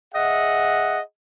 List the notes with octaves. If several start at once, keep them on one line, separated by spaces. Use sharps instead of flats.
G#4 D#5 E5 F#5